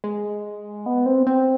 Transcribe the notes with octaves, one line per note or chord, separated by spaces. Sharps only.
G#3
B3
C4
C4